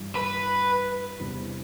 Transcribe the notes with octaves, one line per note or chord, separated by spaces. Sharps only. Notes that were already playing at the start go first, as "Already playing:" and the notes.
Already playing: G2 E3 G3
B4
E2 C3 G3 D4